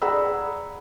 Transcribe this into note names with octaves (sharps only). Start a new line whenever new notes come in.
G#4 D5 F#5 A#5 B5 E6